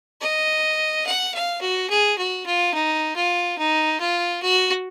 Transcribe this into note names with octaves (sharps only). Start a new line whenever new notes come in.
D#5
F#5
F5
F#4
G#4
F#4
F4
D#4
F4
D#4
F4
F#4